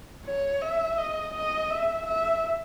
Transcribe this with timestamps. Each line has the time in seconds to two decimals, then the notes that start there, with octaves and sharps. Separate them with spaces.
0.26 C#5
0.62 E5
0.98 D#5
1.34 D#5
1.71 E5
2.07 E5